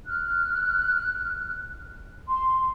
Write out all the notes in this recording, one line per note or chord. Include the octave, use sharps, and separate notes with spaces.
F6 F#6
C6